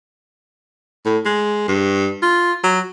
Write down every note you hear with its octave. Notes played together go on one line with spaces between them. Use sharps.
A2
G#3
G2
F4
F#3